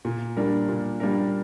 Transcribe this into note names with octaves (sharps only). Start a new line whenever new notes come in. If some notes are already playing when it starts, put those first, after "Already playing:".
A#2
G3 A#3 D4 A#4
A#2
G3 A#3 D4 A#4